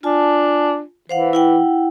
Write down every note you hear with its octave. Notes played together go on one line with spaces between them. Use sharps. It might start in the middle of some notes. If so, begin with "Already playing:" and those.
D4 F4 G#5 A5
E3 C5 F5 F#5
E4 F#5 G5